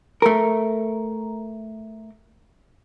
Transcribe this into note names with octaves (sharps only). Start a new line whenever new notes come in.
A3 A#4